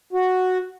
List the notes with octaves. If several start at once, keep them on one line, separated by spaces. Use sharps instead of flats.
F#4